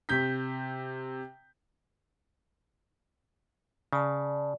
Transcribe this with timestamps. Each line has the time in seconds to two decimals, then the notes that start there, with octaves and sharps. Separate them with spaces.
0.09 C3 G6 B6
3.93 C#3 D5 A5